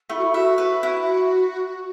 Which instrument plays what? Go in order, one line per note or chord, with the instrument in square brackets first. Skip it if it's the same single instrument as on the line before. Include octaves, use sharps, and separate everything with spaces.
[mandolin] A3 [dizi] E4
[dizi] F#4
E4
[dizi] F#4 [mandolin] E5
[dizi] F#4 [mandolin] B4
[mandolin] E4